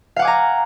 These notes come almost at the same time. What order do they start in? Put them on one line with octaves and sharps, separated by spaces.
F5 F#5 D6 G#5 A#5